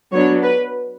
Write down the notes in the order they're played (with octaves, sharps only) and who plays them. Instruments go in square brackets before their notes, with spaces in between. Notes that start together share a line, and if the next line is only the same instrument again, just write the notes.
[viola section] F#3 B3 D4 C#5
B4